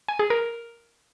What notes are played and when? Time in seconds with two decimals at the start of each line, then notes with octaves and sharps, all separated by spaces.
0.08 G#5
0.19 G#4
0.30 A#4